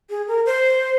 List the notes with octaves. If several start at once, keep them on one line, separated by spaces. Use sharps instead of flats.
G#4
A#4
C5